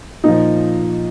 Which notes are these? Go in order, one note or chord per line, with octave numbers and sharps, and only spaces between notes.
A#2 F3 D#4